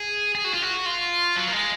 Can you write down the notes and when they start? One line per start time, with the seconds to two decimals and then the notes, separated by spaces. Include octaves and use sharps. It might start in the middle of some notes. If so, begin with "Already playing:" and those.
Already playing: G#4
0.35 G#4
0.44 F#4
0.54 F4
0.62 F#4
0.86 F4
1.37 F#3
1.48 A#3
1.53 G#3